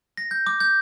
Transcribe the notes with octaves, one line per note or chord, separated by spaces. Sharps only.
A#6
G6
D6
G6